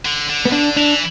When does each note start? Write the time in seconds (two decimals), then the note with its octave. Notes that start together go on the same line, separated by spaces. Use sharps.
0.05 D3
0.29 D3
0.45 B3
0.52 D3 D4
0.76 E3 D4